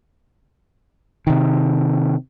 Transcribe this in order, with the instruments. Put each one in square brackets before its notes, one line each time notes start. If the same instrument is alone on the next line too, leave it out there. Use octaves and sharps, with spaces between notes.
[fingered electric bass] C3 D#3